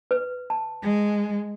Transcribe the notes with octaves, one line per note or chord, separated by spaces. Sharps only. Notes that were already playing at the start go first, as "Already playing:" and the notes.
B4
A5
G#3